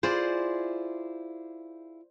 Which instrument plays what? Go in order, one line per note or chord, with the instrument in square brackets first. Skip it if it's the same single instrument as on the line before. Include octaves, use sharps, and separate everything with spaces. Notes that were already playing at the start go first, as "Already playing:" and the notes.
[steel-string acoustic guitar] E4 F4 G#4 [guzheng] C5 D5